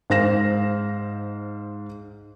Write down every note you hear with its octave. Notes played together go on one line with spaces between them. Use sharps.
G#2 C5 F5 A#6 E7